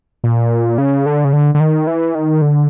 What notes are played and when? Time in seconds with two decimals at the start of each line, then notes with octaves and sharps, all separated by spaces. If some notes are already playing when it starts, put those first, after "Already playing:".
0.24 A#2
0.78 C#3
1.06 D3
1.25 C#3
1.33 D3
1.55 D3
1.60 D#3
1.87 E3
2.15 D#3
2.42 D3